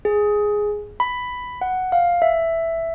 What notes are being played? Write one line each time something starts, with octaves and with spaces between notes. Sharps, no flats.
G#4
B5
F#5
F5
E5